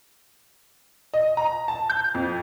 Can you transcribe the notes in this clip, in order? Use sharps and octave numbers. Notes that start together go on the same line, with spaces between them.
D#5
A#5
A5
G6
F2